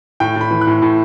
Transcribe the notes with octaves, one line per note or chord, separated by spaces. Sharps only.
A2 G5
A2 B5
E3
F#6
A2
A2